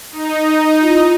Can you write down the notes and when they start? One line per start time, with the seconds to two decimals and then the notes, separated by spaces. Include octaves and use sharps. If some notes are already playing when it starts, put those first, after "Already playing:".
0.12 D#4
0.81 E4 F4